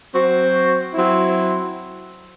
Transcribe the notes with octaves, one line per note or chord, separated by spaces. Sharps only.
F#3 C4 F#4 C5
F#3 C4 E4